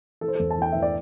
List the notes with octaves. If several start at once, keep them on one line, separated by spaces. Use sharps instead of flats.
E3 A4
C5
E2 A4
A5
E3 G5
E3 E5
D5